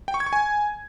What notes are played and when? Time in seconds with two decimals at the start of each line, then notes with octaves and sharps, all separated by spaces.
0.08 G5
0.14 C#6
0.20 G#6
0.26 C#6
0.33 G#5